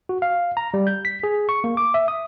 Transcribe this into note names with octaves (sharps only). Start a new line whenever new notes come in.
F#4
F5
A#5
G3
G6
B6
G#4
C#6
A#3
D6
E5
D#6